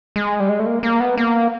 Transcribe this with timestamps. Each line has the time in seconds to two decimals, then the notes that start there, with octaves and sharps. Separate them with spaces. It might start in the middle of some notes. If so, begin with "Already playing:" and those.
0.16 G#3
0.40 G3
0.49 G#3
0.60 A3
0.66 A#3
0.83 A#3
1.00 B3
1.18 A#3